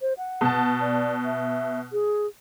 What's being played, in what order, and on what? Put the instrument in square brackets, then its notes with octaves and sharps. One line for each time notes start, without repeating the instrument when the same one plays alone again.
[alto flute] C5
F#5
[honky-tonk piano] B2 A5
[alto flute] D5
E5
G#4